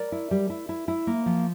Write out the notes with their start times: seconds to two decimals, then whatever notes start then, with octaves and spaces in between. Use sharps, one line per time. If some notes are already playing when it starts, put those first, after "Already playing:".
Already playing: A#4 D5
0.12 E4
0.31 G3
0.50 E4
0.69 E4
0.88 E4
1.07 A#3
1.26 F3